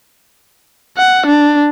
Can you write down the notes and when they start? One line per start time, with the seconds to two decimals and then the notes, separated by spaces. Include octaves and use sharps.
0.98 F#5
1.27 D4